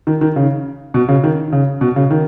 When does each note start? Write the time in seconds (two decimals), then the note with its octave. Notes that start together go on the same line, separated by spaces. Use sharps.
0.07 D#3
0.21 D#3
0.36 C#3
0.94 B2
1.08 C#3
1.24 D#3
1.52 C#3
1.81 B2
1.96 C#3
2.11 D#3